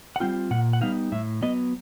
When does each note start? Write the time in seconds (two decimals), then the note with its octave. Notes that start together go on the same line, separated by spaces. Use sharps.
0.16 F#5
0.20 G3 C4 F4 G5
0.51 A#2 F#5
0.73 F#5
0.81 G3 B3 D#4 F5
1.12 A2 E5
1.42 F#3 B3 D#5